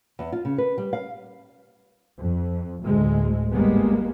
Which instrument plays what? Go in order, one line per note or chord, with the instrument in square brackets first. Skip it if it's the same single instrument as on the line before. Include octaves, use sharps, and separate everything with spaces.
[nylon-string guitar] E2
F4
C#3
B4
G3
F5
[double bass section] F2
D2 A2 G#3
G#1 G3 G#3 A#3 B3